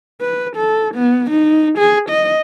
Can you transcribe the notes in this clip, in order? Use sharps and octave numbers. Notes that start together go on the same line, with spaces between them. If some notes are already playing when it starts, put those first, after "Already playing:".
B4
A4
B3
D#4
G#4
D#5